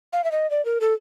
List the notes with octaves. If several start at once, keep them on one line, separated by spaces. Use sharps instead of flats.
F5
E5
D#5
D5
A#4
A4